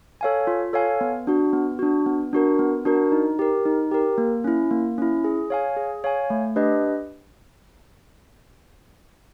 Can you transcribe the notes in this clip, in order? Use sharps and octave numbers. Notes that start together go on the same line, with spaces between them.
A4 C#5 F5 G#5
F4
A4 C#5 F5 G#5
B3
D4 F#4
B3
D4 F#4
B3
D4 F#4 A#4
B3
D4 F#4 A#4
D#4
G4 A#4
D#4
G4 A#4
A#3
C#4 E4
A#3
C#4 E4
G#4
C#5 F5 G#5
G#4
C#5 F5 G#5
A3
D4 G4 B4 D#5